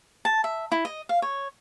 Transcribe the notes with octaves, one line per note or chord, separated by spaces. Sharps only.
A5
E5
E4
D#5
F5
C#5